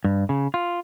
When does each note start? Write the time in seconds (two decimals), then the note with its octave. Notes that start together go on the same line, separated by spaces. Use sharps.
0.04 G2
0.29 C#3
0.54 F4